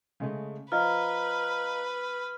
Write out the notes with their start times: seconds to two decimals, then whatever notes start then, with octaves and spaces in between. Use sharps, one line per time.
0.20 C#3 G#3 A3
0.72 F3 B4 D#5 F5 A#5 F6